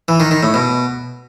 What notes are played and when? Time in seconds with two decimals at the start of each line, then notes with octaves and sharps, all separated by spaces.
0.08 E3
0.20 D#3
0.31 D#3
0.43 A2
0.54 B2